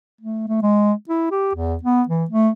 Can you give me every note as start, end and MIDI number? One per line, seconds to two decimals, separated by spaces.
0.21 0.44 57
0.48 0.59 57
0.62 0.92 56
1.09 1.27 64
1.31 1.54 67
1.54 1.75 40
1.83 2.02 59
2.09 2.24 52
2.30 2.49 57